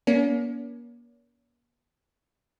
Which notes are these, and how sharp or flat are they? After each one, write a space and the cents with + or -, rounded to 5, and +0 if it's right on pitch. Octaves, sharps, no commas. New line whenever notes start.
A#3 +40 C#4 +45